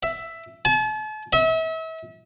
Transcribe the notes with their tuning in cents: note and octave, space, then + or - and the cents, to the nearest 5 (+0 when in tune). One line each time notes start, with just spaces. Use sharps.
E5 +10
A5 -40
E5 -35